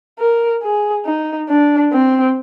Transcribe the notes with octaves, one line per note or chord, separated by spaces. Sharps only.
A#4
G#4
D#4
D4
C4